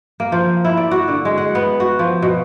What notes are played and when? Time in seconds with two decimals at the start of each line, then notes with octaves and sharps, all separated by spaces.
0.20 A#3
0.32 F3
0.65 E4
0.77 D5
0.91 F#4
1.08 D3
1.25 G#3
1.37 F#5
1.55 B3
1.80 F#4
1.99 F3
2.22 B2